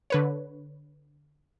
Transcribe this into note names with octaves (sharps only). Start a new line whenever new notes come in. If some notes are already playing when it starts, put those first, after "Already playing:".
D3 B4 C#5